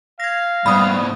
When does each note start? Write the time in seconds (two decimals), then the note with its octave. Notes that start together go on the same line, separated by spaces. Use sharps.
0.20 F5 G#6 A#6
0.66 G#2 B2 G3 B5 D#6